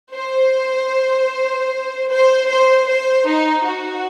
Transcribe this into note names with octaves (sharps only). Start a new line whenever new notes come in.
C5
C5
C5
C5
D#4
F#4